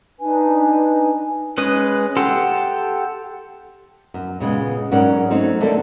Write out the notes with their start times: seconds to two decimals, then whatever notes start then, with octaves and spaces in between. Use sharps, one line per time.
0.20 D4 D#4 B4 G#5
1.58 G#3 C#4 B4 D#6
2.17 G4 A4 F#5 C6
4.14 F#2
4.40 A#2 C#3 G#3 B3
4.91 G#2 F#3 C#4 A#4 D5 F#5
5.30 F#3 A3 C4 C#4 D#4
5.61 D3 A3 A#3 A4 D5 A5